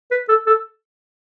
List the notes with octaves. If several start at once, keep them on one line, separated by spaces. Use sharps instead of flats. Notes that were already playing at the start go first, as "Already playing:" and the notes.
B4
A4
A4